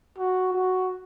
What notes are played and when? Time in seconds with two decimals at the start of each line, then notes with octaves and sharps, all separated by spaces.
0.18 F#4
0.53 F#4